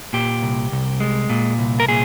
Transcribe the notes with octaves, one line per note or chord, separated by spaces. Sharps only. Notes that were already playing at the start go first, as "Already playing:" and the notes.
A#2 G4
C2
C2
G#3
A#2
C2
A#4
A#2 G#4